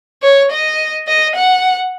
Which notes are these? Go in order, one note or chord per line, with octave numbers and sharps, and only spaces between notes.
C#5
D#5
D#5
F#5